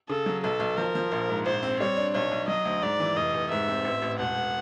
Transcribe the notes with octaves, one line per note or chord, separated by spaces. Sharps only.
C#3 A4
F#3
B1 A4
B1
F3 A#4
F3
A#1
G#2
A#1 C5
C4
G3 C#5
D4
B1 C#5
B1
F#3 D#5
D2
G#2 D5
E3
F1 D#5
F1
G#2 E5
C4
A1
A1
E1 F#5
E1